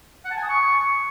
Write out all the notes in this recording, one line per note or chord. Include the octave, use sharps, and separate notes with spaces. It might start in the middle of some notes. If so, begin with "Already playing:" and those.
F#5
A5
G#5
D#6
C#6